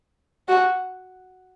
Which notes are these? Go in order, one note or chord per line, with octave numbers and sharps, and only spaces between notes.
F#4